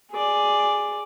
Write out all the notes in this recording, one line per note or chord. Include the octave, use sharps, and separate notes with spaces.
G#4 D5